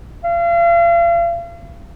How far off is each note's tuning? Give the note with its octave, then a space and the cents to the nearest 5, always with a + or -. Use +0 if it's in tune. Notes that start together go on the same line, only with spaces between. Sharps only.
F5 -40